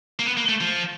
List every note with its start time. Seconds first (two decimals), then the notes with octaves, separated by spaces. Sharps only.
0.19 A#3
0.26 B3
0.37 A#3
0.49 A3
0.61 F3